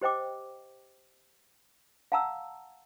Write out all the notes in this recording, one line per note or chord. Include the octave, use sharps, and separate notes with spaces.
G4 C5 D#5 G5 D6
F5 F#5 A5 A#5 E6